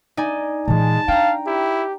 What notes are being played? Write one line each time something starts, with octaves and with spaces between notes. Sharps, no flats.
D#4 D5 G#5
A#2 E3 G#3 A5
D4 F5 G5 A#5
E4 G4